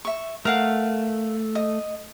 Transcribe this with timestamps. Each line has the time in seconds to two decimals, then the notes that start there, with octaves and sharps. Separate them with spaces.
0.05 E5 C#6
0.45 A3 A#4 F5 F#5
1.55 D#5